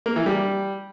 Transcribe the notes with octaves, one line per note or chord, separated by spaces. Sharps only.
A#3
E3
G3